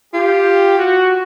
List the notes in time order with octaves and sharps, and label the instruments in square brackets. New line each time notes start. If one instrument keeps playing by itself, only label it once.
[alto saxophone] F4 [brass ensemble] G4
[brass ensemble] F#4